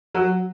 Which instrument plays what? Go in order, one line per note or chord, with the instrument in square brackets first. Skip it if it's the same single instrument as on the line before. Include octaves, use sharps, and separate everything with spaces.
[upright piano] F#3